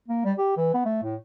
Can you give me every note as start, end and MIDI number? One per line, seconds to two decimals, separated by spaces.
0.08 0.20 58
0.25 0.33 55
0.38 0.56 67
0.57 0.73 52
0.74 0.82 59
0.85 1.01 57
1.03 1.16 45